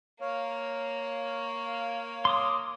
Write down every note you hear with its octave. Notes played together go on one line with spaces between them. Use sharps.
A#3 C#5 F5
C6 D6 D#6